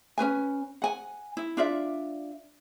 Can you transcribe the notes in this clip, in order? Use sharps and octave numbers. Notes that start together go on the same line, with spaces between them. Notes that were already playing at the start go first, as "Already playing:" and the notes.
C#4 D4 B4 G#5
F#5 G#5
E4
D4 F4 D5 E5